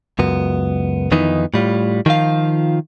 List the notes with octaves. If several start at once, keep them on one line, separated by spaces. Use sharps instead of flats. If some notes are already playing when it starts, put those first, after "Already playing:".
C#2 F#2 B3
F2 D#3 E3 B3 D#4
A2 G3 F4
D#3 F3 F4 F5